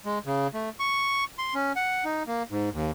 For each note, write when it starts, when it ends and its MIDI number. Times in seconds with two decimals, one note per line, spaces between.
0.06 0.19 56
0.26 0.48 49
0.54 0.69 57
0.80 1.24 85
1.38 1.54 84
1.54 1.72 61
1.76 2.04 78
2.05 2.23 63
2.27 2.43 58
2.51 2.69 44
2.73 2.91 39